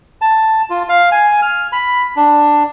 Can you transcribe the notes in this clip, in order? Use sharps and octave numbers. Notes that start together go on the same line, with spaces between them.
A5
F4
F5
G#5
F6
B5
D4